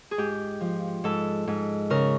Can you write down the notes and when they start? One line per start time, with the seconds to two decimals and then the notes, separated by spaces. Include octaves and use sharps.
0.11 G#4
0.18 G#2 G4
0.61 F3
1.04 G#2 A4
1.47 G#2
1.90 C#3 A#4